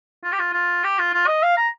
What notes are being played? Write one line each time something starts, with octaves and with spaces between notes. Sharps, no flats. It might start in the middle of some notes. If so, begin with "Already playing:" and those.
F4
G4
F4
F4
G4
F4
F4
D#5
F5
A#5